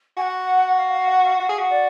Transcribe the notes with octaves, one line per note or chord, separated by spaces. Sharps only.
F#4 F#5 G#5
F5
F5
F#5
F5
F#4 F5 F#5
G#4
F#4
D5